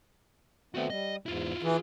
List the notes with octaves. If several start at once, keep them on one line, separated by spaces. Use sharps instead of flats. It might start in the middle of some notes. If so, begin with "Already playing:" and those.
A3 B3 C4 F#4 D5
G3 D#5
E2 G#2 E4 F4
E3 G#4